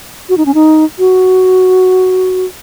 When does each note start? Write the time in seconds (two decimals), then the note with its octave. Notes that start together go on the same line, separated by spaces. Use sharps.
0.29 F#4
0.37 D#4
0.46 C#4
0.54 D#4
0.99 F#4